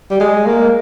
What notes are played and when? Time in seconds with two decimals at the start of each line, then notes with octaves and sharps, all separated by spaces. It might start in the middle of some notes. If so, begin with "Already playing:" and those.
0.11 G3
0.20 G#3
0.46 A#3